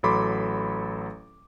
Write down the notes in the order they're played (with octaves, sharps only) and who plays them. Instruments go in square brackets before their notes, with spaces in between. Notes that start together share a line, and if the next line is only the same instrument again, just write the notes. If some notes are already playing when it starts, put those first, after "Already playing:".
[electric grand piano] A1 F#3 A4 B5 C6 D6